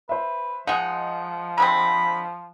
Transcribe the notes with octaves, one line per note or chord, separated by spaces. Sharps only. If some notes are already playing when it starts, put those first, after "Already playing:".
B4 C5 E5
F3 G#3 D#4 F#5
D3 G#3 C4 B5